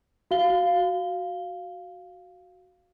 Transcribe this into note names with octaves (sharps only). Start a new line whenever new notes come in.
F#4 F5 G7